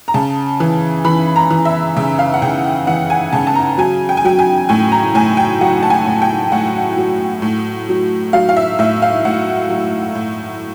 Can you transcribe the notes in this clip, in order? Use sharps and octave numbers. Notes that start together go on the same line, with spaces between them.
A#5
C#3 A5
E3
E3 B5
A#5
E3
E5
C#3 E5
F5
F#5
C#3 G5
F#5
E3 F#5
G#5
C#3 A5
A5
A#5
F#3 G#5
G5
G#5
F#3 G5
G#5
A2 G#5
A#5
A2 G#5
G5
F#3 F#5
A5
G#5
A2
G5
A2 F#5
F#3
A2
F#3
F#3 F5
F5
E5
A2 E5
F5
A2 F#5
F#3
A2